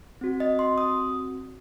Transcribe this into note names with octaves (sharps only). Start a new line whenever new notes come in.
C4 F#4
D#5
C6
D#6